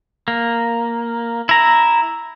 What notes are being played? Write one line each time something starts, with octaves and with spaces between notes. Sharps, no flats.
A#3
E4 A#5